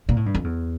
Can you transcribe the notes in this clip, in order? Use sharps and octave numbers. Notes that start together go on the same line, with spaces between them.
A#2
A2
G2
F2
E2